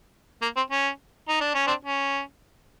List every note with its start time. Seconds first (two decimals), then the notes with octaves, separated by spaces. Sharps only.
0.42 A#3
0.56 C4
0.70 C#4
1.29 D#4
1.41 D4
1.54 C#4
1.67 C4 D4
1.85 C#4